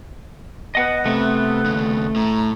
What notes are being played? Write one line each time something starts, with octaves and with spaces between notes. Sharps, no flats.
B3 D#5 F#5
C3 A3
D#2 C#3
A2 A#5